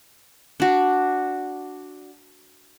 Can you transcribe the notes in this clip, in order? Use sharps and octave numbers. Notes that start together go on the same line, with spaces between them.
D4 F#4